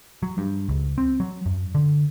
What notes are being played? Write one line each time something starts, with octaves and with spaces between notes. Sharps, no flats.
F#3
G2
C#2
C4
F#3
F#2
D3